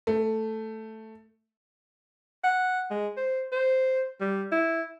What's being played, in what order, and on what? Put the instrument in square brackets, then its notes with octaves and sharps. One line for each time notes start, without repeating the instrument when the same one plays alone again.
[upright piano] A3
[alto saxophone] F#5
G#3
C5
C5
G3
E4